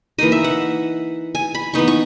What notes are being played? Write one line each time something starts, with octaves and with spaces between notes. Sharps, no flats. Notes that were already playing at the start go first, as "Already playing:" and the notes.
E3 A#3 D#4 D#5
E5
F#5
G#5
B5
E3 B3 D#4 C#6
C#6